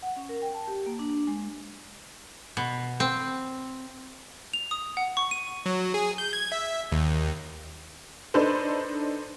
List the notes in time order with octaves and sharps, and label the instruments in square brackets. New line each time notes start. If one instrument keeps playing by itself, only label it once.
[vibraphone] F#5
C#4
A#4
G5
A5
G4
A#3
D4
G#3
[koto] B2
C4
[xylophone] F7
D#6
F#5
C#6
D#7
[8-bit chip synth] F#3
G#4
G6
G#6
E5
D#2
[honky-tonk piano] D4 D#4 A4 B4 C5